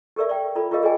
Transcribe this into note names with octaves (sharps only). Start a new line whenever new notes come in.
G4 A4 A#4 D5 E5
D5 E5 G5
F4 A4 D5 B5
F4 G4 G#4 A#4 D#5 F5
G#4 A#4 D5 D#5 G5 G#5